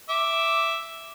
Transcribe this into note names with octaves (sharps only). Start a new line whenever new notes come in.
E5 D6